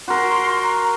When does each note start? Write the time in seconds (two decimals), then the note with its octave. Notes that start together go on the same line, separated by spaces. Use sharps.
0.08 F#4 A#4 C6
0.63 A#5